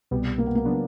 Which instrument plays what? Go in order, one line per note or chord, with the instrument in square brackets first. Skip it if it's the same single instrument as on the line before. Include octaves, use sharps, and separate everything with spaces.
[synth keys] C2 B2 G3 B3
[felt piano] A#3
B3
A#3
[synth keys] C#3 F#3 B3 D4